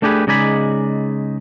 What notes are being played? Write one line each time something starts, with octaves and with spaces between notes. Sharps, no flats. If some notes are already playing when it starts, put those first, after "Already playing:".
A3 D4 G4 G#4 A#4 B4
C#3 G#3 D#4 D5 G#5 B5